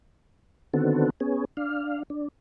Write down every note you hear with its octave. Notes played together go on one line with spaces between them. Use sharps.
D3 D#3 B3 C4 F#4 A4
B3 C#4 G#4
D4 F5
D4